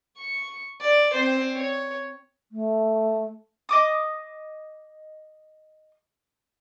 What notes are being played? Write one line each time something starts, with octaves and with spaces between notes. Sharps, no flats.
C#6
D5
C4 C5
C#5
A3
D#5 D6 D#6